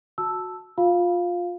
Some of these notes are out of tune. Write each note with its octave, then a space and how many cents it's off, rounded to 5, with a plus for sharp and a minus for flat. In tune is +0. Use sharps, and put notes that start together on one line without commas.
F#4 -20 A5 +0 E6 +0
F4 +20 F5 +0